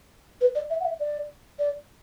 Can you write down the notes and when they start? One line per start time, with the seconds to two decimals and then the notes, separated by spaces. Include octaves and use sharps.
0.41 B4
0.55 D5
0.70 E5
0.80 F#5
0.85 E5
1.00 D5
1.59 D5